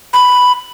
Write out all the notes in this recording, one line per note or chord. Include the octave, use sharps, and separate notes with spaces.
B5